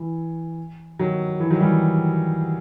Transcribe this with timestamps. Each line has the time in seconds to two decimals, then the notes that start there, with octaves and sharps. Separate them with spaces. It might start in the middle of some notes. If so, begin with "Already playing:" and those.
Already playing: E3
0.99 D#3 F#3
1.40 E3
1.50 D#3 F#3
1.61 E3 G3